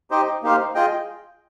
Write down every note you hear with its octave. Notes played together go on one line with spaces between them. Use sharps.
D#4 G4 C5 D#5 G5
A#3 D#4 G4 C5 F5
F4 G#4 D#5 G5